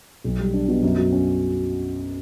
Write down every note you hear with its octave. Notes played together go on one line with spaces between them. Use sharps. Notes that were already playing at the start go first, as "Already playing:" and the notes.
B1
G3
D4
B2
F#2
F#3
C#4